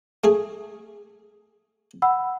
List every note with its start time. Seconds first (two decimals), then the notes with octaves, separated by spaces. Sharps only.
0.24 A3 G#4
2.02 F#5 B5 E6